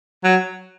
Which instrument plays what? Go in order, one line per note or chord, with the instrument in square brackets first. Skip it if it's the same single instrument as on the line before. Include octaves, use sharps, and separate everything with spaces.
[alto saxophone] F#3